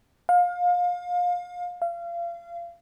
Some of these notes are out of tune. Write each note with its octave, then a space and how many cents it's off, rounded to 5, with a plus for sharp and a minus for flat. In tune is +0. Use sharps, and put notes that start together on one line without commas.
F5 +30
F5 -30